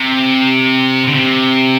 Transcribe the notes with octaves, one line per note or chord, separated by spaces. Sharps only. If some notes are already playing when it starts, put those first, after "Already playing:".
Already playing: C3
D3
C3